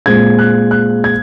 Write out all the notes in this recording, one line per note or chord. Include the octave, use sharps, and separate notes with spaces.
A#2 G#3 C4 G#6
F#6
F#6
G#6